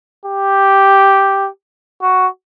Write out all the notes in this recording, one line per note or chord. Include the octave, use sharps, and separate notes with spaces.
G4
F#4